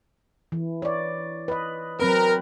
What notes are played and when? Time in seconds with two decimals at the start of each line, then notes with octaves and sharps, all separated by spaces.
0.52 E3
0.82 C#5 D5
1.48 B4 D#5
1.99 F#3 C4 A#4 B4